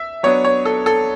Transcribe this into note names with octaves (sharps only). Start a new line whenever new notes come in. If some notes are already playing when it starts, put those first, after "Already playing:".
Already playing: E5
F#3 B3 D4 C#5
C#5
A4
A4